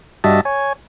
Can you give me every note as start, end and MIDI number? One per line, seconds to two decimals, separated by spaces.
0.24 0.41 43
0.24 0.41 55
0.24 0.41 66
0.24 0.41 75
0.24 0.41 76
0.24 0.41 81
0.45 0.73 73
0.45 0.73 80